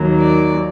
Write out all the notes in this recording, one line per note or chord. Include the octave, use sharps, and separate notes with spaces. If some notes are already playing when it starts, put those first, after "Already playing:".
Already playing: D#2 D#3 F#3 A#3
D5